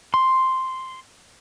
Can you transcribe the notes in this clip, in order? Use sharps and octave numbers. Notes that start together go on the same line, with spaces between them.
C6